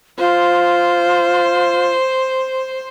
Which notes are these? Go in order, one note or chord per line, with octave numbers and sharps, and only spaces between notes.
F4 C5